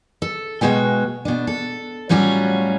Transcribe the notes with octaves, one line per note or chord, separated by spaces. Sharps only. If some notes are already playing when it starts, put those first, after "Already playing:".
A4
B2 F#3 G#3 F#4 G5
B2 D4
A4
A2 F#3 G3 C#4 F4 F#4